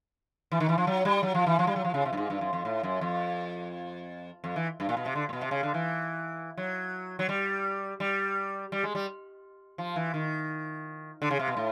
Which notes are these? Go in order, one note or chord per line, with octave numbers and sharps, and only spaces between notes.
E3
D#3
E3
F3
F#3
G3
F#3
F3
E3
F3
G3
F#3
F3
C#3
C3
G2
G#2
G2
F#2
F2
A2
F#2
F2
F2
E3
G2
A#2
B2
C3
D3
A#2
B2
C3
C#3
D3
E3
F#3
F#3
G3
G3
G3
G#3
G3
F3
E3
D#3
D3
C#3
C3
B2
A2